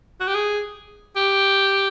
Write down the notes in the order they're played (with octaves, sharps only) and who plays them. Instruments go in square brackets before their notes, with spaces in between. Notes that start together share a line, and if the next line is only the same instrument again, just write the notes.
[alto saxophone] F#4
G4
G#4
G4